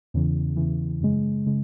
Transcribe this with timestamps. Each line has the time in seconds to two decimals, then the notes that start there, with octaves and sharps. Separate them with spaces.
0.14 E2 C#3 E3
0.57 E2 C#3 E3
1.01 F#2 C#3 G#3
1.46 C#3 G#3